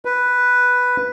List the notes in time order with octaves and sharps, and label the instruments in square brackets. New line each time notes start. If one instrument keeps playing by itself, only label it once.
[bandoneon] B4